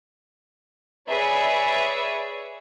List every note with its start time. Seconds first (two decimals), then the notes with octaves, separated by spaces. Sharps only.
1.09 G#4 B4 C#5 D5 E5